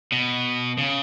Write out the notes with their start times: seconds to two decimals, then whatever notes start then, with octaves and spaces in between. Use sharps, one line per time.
0.12 B2
0.78 C#3